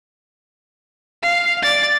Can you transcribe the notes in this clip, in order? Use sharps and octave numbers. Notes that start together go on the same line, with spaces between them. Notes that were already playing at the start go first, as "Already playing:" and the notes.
F5
D5 A6